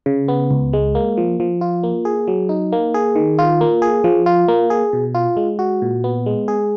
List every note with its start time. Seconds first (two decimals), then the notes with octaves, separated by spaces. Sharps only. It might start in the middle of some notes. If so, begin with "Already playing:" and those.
0.06 C#3
0.28 B3
0.51 C#2
0.73 G#3
0.95 A#3
1.17 F3
1.40 F3
1.61 F4
1.83 A#3
2.05 G#4
2.28 F#3
2.49 D#4
2.73 A#3
2.94 G#4
3.16 D#3
3.39 F4
3.61 A#3
3.82 G#4
4.04 F3
4.26 F4
4.48 A#3
4.70 G#4
4.93 B2
5.15 F4
5.37 G#3
5.59 F#4
5.82 A#2
6.04 B3
6.26 G#3
6.48 G#4